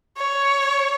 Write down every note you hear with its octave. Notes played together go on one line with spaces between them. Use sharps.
C#5